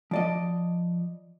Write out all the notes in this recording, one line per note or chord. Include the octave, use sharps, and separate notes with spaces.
F3 D5 D#5